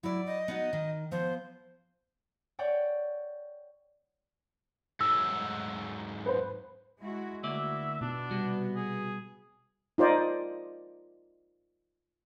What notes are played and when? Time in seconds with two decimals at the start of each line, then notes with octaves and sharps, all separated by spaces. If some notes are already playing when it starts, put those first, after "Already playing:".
0.03 F#3 E4 D5
0.26 D#5
0.48 B3 D#4 F#4
0.73 D#3
1.12 F3 B3 C5
2.59 C#5 D5 F#5 G5 C#6
5.01 G#2 F#3 E6
6.26 B4 C5
7.00 G#3 E4 F#4
7.44 D2 A#3 E4 F#4 D5 E5
8.01 B2 B3 D4 D#4
8.31 C3 G3 F#4
8.76 G#4
9.98 D#4 F4 C5 D5 D#5